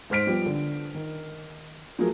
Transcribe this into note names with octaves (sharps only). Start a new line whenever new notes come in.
G#2 C5 F6 B6 D7
F3 G3 B3
D3
D#3
F3 F#3 A3 G#4 A#4